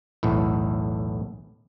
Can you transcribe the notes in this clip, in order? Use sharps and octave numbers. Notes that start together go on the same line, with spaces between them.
B1 E2 A2